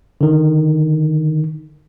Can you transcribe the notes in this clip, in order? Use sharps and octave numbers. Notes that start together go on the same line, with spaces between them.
D3 D#3